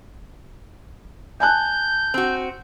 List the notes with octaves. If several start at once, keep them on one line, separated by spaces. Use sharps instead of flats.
G#5 A5 F#6 G6
C4 F#4